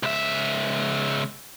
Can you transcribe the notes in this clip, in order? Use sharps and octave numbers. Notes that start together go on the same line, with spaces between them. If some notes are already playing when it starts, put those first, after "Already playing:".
C#2 E5